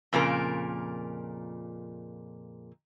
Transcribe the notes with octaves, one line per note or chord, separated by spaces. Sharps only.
F2 A#2 C#3 A#4